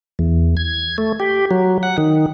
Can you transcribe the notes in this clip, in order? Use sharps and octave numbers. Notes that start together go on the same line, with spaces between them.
E2
G#6
A3
G4
F#3
F#5
D#3